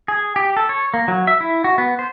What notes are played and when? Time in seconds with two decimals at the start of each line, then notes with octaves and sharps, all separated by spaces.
0.08 G#4
0.36 G4
0.57 A4
0.69 C#5
0.94 A#3
1.08 F#3
1.27 E5
1.40 E4
1.64 F#4
1.78 B3
1.99 C5